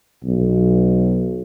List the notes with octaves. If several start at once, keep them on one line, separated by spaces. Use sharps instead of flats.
B1